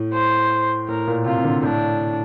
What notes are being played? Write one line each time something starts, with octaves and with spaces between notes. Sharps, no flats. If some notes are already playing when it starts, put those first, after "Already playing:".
Already playing: A2
C5
A2 A#4
A#2
C3 F4
C3
D3
A2 D4